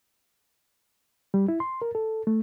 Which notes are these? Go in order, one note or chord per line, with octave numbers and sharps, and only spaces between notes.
G3
E4
C6
A#4
A4
A3